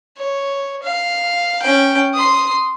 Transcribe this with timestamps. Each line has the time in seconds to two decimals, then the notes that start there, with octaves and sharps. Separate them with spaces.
0.18 C#5
0.83 F5
1.62 C#4 G5
2.14 C6 D#6